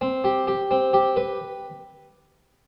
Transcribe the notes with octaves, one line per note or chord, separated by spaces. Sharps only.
C4
G4
G4
C4
G4
B4